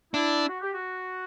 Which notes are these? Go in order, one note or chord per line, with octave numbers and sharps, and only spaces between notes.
D4 E4
F#4
G4
F#4